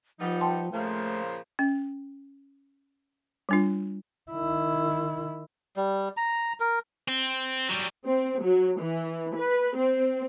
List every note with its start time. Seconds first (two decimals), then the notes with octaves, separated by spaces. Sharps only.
0.19 F3 G3 B3 D#4
0.41 G5 A5 C6
0.73 A#2 C#3 F3 A3
1.59 C#4
3.49 G3 D4 F4
4.31 D#3 E4
5.76 G3
6.17 A#5
6.60 A#4
7.08 C4
7.69 F#3 G3
8.05 C4
8.43 F#3
8.80 E3
9.36 B4
9.76 C4